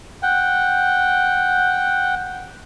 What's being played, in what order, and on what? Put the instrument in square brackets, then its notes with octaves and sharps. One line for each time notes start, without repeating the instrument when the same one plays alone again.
[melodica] F#5 G5